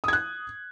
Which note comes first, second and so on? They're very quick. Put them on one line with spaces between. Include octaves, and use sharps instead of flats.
D#6 G#6 F#6